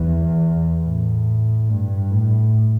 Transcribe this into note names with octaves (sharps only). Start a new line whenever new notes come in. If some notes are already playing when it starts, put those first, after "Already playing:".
Already playing: E2
A2
G2
A2